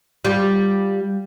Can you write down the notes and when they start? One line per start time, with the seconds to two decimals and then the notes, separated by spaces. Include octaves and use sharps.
0.25 G3 F4 G4